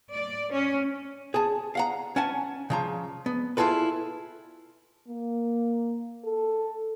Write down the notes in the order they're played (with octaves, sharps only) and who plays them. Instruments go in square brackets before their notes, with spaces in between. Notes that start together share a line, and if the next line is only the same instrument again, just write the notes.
[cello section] D5
C#4
[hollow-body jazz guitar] G#4 A5
F5 F#5 A#5
C#4 F#5 G#5 A5
C#3 F3 A#5
B3
E4 F4 G#4 A4 B4
[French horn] A#3
A4